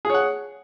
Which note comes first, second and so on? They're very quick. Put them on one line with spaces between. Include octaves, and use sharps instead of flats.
G#4 C#5 F#5